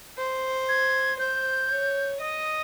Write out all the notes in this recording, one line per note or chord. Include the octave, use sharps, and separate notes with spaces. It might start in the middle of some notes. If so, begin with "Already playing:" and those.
C5
G#6
C5 G6
C#5
D#5 D#6